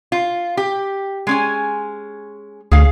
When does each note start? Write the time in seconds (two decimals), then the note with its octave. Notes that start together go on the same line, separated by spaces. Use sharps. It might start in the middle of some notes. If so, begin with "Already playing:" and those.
0.12 F4
0.57 G4
1.27 G#3 C#4 G#5
2.72 D2 G#4 F5